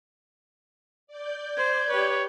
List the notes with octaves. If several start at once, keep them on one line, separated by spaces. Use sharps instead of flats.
D5 G6
C5 G#6
G4 B4 C#5